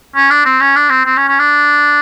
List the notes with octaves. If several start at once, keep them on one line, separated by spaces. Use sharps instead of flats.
C#4
D4
C4
C#4
D4
C4
C4
C#4
C#4
D4